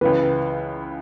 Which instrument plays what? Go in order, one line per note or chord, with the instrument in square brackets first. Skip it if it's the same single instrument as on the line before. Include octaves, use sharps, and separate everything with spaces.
[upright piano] C#2 C#3 E3 [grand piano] B4